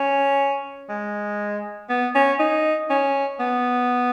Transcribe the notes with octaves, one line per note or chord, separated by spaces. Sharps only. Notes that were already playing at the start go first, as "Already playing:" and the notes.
Already playing: C#4
G#3
B3
C#4
D#4
C#4
B3